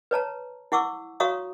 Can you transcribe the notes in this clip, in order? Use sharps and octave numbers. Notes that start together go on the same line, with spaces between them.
B4 C#5 A5 A#5
E4 F#5 C#6 D6 E6
F#4 C#5 F5 A#5 C#6 D#6